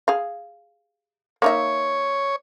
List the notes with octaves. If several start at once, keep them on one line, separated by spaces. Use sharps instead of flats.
G#4 F5
A#3 D#4 C#5 E5